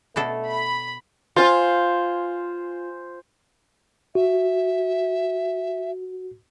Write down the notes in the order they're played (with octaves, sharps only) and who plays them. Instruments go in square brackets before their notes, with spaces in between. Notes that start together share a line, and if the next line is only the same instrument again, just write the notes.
[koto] B2 D4 A4 [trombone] A3
[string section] B5
[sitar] F4 [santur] C5 G#5
[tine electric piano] F#4 [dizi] E5